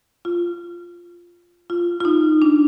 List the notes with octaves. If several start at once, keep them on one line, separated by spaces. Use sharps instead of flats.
F4
F4
F4
D#4
D4